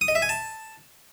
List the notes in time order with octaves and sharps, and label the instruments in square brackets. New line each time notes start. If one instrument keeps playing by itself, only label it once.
[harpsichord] D#6
D#5
E5
G#5
A5